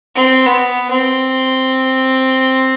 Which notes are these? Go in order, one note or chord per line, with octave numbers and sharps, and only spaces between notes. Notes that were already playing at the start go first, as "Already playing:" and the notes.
C4
B3
C4